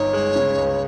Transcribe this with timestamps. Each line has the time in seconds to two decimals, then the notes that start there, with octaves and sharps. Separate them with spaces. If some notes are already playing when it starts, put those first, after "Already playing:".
Already playing: G1 D#4 C#5
0.13 G#3
0.36 C#3
0.57 C#2